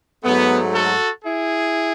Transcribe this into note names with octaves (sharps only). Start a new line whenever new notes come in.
G#2 F#3 A3 B3
F#4 A4
E4 G#4